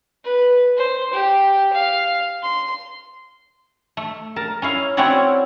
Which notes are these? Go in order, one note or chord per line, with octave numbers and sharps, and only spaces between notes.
B4
C5
G4
F5
C6
A3
A#4 A5
C#4 E4 F5
C4 C#4 E4 F#4 C#5 D5